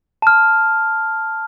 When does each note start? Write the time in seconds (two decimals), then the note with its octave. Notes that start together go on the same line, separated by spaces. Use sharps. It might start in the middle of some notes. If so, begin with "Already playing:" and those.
0.22 A5 F6